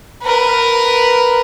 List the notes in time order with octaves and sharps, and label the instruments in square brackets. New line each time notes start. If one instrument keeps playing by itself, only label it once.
[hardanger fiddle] A#4 B4